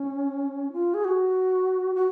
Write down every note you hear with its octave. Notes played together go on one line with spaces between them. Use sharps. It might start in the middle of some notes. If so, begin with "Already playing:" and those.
Already playing: C#4
F4
G#4
F#4
F#4